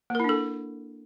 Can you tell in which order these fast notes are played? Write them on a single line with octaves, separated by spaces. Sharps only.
A#3 A#4 E4 D4 A4